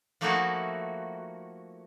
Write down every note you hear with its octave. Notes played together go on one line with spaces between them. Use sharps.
F3 A3 A#3 D#4 E4 F#4